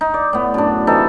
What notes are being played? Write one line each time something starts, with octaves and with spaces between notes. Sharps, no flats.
D#4
D5
A2 B3
F#2 D4
C3 E3 D#4 A4